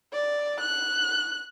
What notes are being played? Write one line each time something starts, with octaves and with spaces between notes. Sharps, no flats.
D5
F#6